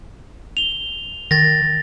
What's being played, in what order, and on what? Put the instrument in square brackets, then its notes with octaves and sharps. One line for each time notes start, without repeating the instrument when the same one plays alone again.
[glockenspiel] F7 G7
[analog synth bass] D#3 [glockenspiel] A6 A#6